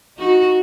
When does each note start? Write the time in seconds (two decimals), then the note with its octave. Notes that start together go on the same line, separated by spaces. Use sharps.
0.18 D#4 F#4